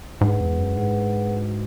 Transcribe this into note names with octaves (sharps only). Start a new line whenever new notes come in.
G#2 G#3 D4 G#4 B4 F#5
E2
F#2
G#2 G#3 D4 G#4 B4 F#5
G#3 D4 F#4